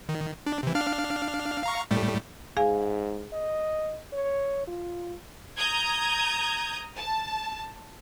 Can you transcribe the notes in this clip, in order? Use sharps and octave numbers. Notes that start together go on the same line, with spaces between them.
D#3
D4
C3 E3
D4 F5 F6
F5 A#5 C#6
A2 G3 A3
G#2 G#4 F5 G#5
D#5
C#5
F4
A#5 D#6 G6 G#6
A5